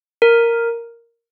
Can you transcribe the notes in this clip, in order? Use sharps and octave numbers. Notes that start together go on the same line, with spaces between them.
A#4